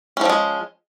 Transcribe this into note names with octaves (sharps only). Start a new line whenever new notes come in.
F3 G3 G#3 C#4